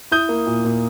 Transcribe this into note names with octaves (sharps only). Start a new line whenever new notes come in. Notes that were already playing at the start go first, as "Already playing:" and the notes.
E4 D#6 G6
A#3
A#2
A#2